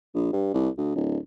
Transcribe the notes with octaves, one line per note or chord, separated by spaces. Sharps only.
A#1
G2
C2
D2
D1